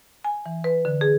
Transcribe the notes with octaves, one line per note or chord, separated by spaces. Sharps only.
G#5
E3
B4
D3
G#4